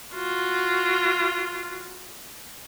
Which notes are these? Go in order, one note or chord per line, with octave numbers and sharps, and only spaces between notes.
F4 F#4